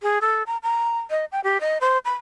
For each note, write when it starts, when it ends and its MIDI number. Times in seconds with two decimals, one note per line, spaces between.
0.03 0.18 68
0.21 0.43 69
0.46 0.57 82
0.63 0.99 82
1.10 1.25 75
1.32 1.40 79
1.44 1.60 67
1.61 1.78 75
1.81 1.98 72
2.05 2.15 83